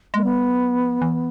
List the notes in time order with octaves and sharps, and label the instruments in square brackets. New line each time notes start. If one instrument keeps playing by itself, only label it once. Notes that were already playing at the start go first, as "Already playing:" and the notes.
[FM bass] G#3 [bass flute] A#3
[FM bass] G3 [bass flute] B3
[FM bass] F#3
F3
E3